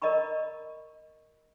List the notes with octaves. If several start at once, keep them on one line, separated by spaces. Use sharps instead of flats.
A#4 D5 D#5 A#5 B5 C#6